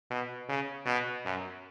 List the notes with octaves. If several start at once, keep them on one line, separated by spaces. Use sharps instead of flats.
B2
C#3
B2
F#2